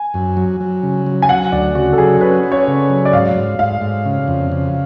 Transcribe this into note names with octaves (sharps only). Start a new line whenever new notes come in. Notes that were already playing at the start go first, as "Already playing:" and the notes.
Already playing: G#5
F#2
F#3
F#3
C#3
F#3
G#5
F#3 F#5
D2 D5
C#3 F#4
A4
F#3 G#4
C#4 B4
C#4
C#5
C#3
F#3
D5
G#2 F5
G#2
G#2 F5
G#2
C#3
F2
C#3